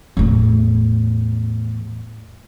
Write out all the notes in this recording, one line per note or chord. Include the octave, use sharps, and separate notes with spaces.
E2 A2